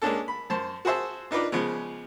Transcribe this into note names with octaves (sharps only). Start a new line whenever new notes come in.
G#3 A#3 C#4 D4 A4
B5
F#2 C5 A5
F#4 G#4 C5 E5 A5
D4 D#4 F4 B4 D5
C#3 F3 G#3 B3